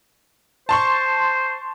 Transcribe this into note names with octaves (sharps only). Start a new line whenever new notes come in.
C5 A5 C6 C#6